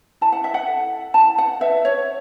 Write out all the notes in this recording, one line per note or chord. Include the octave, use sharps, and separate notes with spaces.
E4 A5
F#5
E5
F#5
A4
E4 A5
F#5
B4 E5
C#5